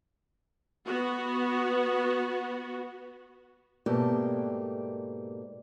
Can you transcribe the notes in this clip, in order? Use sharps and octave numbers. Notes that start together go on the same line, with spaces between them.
B3 F#4
G#2 B2 A3 A#3 G4 D5